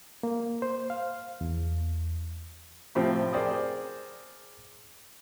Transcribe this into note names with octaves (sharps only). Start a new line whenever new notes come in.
A#3
C5
F5
E2
A2 C3 F3 C4
G#4 A#4 C5 D5 G5 D#6